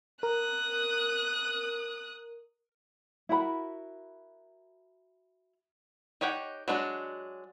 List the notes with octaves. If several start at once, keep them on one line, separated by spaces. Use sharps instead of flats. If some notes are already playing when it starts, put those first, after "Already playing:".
A#4 D#6 F#6
E4 F#4 A#4 B5
D#4 G4 C#5 F#5 G5
F#3 G#3 D4 F4 F#4